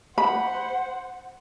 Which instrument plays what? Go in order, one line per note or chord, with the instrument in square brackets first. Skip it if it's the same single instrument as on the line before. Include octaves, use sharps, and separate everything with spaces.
[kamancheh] C5 F#5 [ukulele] B5